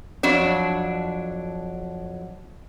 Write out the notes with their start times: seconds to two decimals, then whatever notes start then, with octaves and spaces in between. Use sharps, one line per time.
0.23 F2 F#3 D4